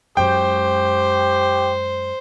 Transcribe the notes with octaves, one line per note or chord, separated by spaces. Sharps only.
F#2 G#3 G4 C5 G5